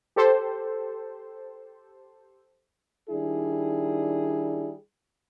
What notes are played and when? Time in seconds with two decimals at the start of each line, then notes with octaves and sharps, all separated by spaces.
0.16 G4 A4 C5
3.10 D#3 G3 D4 E4 G#4